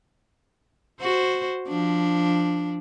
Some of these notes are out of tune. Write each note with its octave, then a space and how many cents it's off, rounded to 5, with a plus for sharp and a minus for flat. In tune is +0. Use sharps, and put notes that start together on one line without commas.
F#4 +0 C5 +0
F3 +0 D4 +0